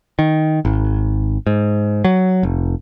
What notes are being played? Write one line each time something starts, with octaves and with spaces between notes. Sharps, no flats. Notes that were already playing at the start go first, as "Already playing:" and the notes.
D#3
G#1
G#2
F#3
F1